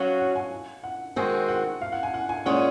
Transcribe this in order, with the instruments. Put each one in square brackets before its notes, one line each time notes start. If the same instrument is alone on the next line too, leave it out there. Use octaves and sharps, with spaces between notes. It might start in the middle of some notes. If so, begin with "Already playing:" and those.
Already playing: [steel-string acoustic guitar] F#3 C#4 F#4 [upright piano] F5
[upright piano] F#5
G#5
F#5
[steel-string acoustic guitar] D#3 G#3 C4 F#4 [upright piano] G#5
[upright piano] F#5
F5
F#5
G#5
F#5
G#5
[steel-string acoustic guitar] A#2 G#3 C#4 [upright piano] F#5